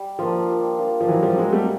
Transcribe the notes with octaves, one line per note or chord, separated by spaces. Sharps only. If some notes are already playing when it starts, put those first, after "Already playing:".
Already playing: G3
F3 A#3 D4 F4
G3
A#3 D4 F4
F3
E3 F#3 C4
F3 G3
F#3 G#3 D#4 F#4 A#4
G3 A3